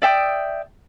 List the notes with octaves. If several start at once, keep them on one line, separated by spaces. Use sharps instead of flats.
D5 E5 G5 D#6